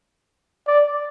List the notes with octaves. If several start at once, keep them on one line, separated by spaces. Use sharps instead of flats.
D5